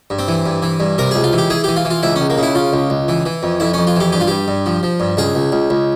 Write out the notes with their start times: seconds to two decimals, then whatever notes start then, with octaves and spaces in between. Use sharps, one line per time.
0.10 G2
0.19 C4
0.28 E3
0.46 G2
0.62 E3
0.80 G2
0.98 C3 A#4
1.11 C#2 G#4
1.24 F4
1.33 E3
1.38 G4
1.50 E3 G#4
1.64 E3 G4
1.76 F4
1.85 E3
1.90 F4
2.03 C#2 E4
2.16 C#4
2.20 C#2
2.30 A#3
2.38 C#3 E4
2.55 C#3 F4
2.73 C#2
2.90 C#2
3.08 E3
3.26 E3
3.43 F2
3.60 F2 E4
3.74 C#4
3.78 F2
3.87 F4
3.96 E3 G4
4.12 G2 G4
4.20 F4
4.27 G2 G4
4.48 G2
4.66 F3
4.83 F3
5.00 G2
5.17 C#2 G#4
5.35 C#2
5.52 C#2
5.70 C#2